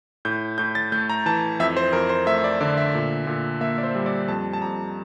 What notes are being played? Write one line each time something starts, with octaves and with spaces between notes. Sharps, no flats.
A2 G6
A2 G6
A6
A3 G6
A#5
E3 A5
F2 E5
C5
F2 A#4
C5
A3 E5
E5
D5
D3 D5
E5
A#2
A#2
A#3 E5
D5
C5
G3
D5
F2 A5
A5
F2 A#5